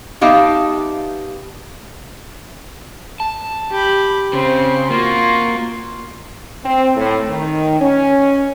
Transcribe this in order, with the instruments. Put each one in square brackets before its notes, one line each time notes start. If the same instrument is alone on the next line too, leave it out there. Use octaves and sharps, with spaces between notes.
[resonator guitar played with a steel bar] B3 D#4 G4 E5 F5 A5
[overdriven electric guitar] A5
[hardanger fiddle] G4 B5
[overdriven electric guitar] C#3 [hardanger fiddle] C4
[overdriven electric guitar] A#3 [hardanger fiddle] F4 F#4
[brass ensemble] C4
A2
D#3
C#4